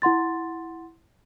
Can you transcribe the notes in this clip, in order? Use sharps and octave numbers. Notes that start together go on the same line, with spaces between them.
E4 F#5 C6 A6